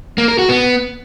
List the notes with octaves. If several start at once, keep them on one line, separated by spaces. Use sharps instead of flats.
A#3
A#4
F#4
B3